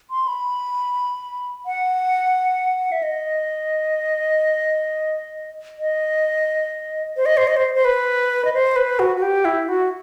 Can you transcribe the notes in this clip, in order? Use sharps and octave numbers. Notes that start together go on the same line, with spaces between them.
C6
B5
F#5
E5
D#5
D#5
C5
D#5
C5
D#5
C5
C5
B4
D#5
C5
B4
F#4
F#4
G4
E4
F#4